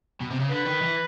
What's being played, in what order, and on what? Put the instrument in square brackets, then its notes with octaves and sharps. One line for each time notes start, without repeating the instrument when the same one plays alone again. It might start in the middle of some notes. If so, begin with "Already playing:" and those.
[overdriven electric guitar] B2
C3
C#3
[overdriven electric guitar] D3 [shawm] B4
[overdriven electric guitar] D#3
E3